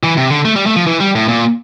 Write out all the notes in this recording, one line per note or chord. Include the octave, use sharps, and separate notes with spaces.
E3
C3
D3
A3
G3
A3
F3
E3
G3
A2
A#2